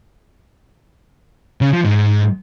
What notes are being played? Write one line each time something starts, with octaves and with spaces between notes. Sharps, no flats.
C#3
F3
G#2